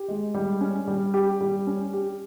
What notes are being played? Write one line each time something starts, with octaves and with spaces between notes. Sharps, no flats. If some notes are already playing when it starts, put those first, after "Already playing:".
Already playing: G4
G#3
G3
C#4
G3
G4
G3
C#4
G4